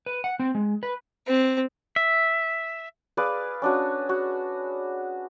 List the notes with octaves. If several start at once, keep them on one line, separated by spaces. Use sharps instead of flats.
B4
F#5
C4
G#3
B4
C4
E5
G#4 B4 D5 F5
C#4 D4 F#4
F#4